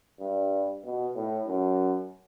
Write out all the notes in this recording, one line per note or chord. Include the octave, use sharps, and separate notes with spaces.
G2
B2
A2
F#2